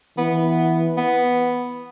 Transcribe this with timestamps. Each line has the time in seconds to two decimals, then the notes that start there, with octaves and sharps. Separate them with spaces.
0.18 E3 B3
0.97 B3